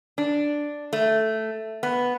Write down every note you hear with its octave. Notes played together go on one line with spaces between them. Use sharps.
D4
A3
B3